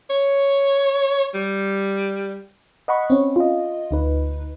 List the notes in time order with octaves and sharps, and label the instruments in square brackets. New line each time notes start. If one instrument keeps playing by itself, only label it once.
[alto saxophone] C#5
G3
[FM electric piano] D#5 F#5 B5 C#6
C4 C#4
F4 D#5
D2 D#4 B4